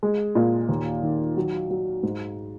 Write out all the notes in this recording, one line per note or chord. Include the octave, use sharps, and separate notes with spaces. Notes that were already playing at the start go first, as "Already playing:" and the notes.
G#3
A#2
D#2
D#3
F#3
F#3
G#2